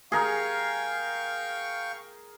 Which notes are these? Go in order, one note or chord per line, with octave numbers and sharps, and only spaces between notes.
G#4 A#4 F5 G5 C#6